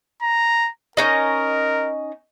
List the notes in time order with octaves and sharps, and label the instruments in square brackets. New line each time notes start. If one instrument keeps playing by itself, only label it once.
[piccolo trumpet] A#5
[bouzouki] C#4 D#4 D#5 [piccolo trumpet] A#4